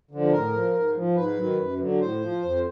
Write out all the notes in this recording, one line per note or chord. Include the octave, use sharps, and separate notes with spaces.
D3 F3
A2 A#4
F3
G#2
F3
G#2 B4
D#3 F#3
F#2
D3 F#3
A2 C5
F3
F2